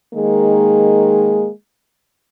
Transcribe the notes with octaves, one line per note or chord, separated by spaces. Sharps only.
D#3 G#3 A#3 G#4